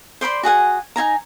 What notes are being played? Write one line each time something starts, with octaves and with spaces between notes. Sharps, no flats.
C5 D5 B5 C6
F#4 G#4 F#5 G#5
D#4 F4 G#5 A#5